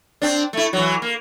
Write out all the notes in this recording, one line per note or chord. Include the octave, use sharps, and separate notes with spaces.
C4 D4
A3 E4
E3 F#3
A#3